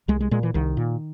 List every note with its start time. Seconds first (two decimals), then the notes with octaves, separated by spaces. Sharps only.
0.08 C2 G#3
0.21 G#3
0.31 A#2 G#3
0.43 E3
0.54 C2 D#3
0.77 A#2